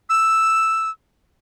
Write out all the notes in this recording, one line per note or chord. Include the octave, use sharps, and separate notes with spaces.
E6